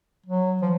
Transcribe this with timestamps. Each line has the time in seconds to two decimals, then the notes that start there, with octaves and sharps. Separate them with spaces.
0.26 F#3
0.62 F3